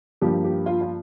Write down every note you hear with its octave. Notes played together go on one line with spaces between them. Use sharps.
G2 F3 A#3 G4
G4
F4
F4